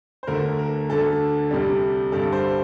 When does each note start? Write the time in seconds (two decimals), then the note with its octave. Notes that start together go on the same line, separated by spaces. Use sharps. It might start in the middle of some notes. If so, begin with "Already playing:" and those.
0.23 C5
0.27 D2 D3 A3 A#4
0.59 A#4
0.90 D2 D3 A3 A4
1.51 C2 C3 G3
2.12 G2 D3 G3 A4
2.32 C5